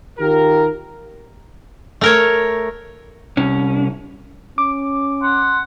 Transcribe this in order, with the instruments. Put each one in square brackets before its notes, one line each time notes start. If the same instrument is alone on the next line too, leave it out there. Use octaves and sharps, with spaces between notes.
[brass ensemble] D#3 F4 G4 A#4
[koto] A3 A#4 C#5
[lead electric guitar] C2 C#4
[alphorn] C#4 [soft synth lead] D6
[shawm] F#5 [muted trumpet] C6